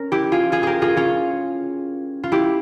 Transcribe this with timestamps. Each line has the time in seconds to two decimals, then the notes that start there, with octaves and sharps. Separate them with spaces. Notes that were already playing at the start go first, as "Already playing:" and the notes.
Already playing: C#4 A#4
0.12 E4 G4
0.32 F4 G#4
0.52 F4 G#4
0.63 G4 G#4 A#4
0.82 F4 G#4
0.97 C#4 F4
2.24 F4
2.32 E4 G4